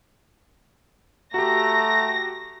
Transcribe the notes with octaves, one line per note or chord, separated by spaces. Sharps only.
A3 F#4 G4 A#5 A#6